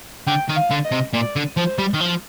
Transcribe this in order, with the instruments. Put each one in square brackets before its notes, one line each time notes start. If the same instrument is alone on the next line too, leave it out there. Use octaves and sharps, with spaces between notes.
[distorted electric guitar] D3 [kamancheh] G5
[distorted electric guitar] D#3
[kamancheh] F5
[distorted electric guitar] D3
[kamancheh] D#5
[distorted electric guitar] C3
[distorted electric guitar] A#2 [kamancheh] D5
[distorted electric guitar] D3
[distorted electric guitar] F3 [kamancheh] C5
[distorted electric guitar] G3
D#3
F3